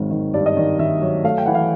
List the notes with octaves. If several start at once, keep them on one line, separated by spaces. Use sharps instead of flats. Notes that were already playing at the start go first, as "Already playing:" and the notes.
Already playing: G#1 D#3 F#3
D#3
G2 D5
D#5
D#3 D5
D#3 E5
F#3
A3 F5
G5
E3 F#5
F5